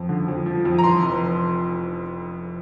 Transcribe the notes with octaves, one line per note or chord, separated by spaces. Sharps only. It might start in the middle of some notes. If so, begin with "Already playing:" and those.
Already playing: F2 F3
D3
F2
F3
F2
A#5
E3 C6
F1